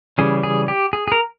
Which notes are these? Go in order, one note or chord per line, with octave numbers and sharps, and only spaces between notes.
C#3 E3 G3 C#4 G#4
G#4
G4
G#4
G#4
A#4